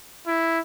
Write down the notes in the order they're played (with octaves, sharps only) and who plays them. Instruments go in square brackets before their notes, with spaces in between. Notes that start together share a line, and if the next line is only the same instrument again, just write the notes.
[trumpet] E4